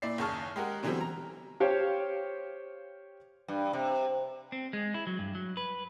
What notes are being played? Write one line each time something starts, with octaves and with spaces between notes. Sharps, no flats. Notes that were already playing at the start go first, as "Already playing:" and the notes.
A#2 E4 D5 C7
F#1 D#2 G#4 A5 C#6 F6
G#3 G4 A#4 F#5
B2 D3 E3 F#3 G3 C4
A#5
G4 C5 C#5 F5 G5
G2
C3
C4
G#3
E4
F#3
G2
F#3
B4